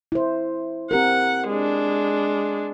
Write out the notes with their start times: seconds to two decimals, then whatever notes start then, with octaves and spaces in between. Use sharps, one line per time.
0.12 E4 C5
0.91 C4 G4 A#4 F#5
1.49 G#3 D4